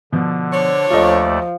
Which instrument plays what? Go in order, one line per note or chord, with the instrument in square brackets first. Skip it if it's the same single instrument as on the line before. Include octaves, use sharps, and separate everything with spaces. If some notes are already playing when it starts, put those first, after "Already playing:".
[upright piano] B2 F3 [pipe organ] D3
[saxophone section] D4 C5 C#5
[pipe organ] D#2 A3 D5 [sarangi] F3 [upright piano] F4 A4 D#5